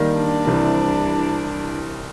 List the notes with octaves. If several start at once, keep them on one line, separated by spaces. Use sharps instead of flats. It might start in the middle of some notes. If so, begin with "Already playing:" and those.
Already playing: D#3 G3 A#3
D4
C2 C3 E3 G3